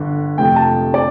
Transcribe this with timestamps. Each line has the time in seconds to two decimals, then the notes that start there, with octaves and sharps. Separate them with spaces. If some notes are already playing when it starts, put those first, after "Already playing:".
Already playing: G1 D3
0.38 F2 C3 F3 A3 G5
0.56 A5
0.94 D5